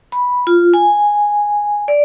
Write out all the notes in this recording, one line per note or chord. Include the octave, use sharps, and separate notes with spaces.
B5
F4
G#5
D5